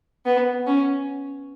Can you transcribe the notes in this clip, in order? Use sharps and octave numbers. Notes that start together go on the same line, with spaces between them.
B3
C#4